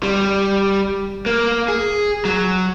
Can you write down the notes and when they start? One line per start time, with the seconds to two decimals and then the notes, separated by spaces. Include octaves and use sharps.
0.03 G3
1.26 A#3
1.68 G#4
2.25 F#3